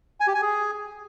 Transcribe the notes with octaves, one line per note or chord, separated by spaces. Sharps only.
G#5
G4
G#5
G#4